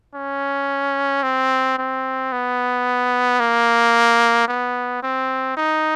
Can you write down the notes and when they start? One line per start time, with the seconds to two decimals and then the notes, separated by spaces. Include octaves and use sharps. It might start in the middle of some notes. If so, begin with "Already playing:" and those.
0.15 C#4
1.23 C4
1.78 C4
2.32 B3
3.40 A#3
4.48 B3
5.03 C4
5.57 D#4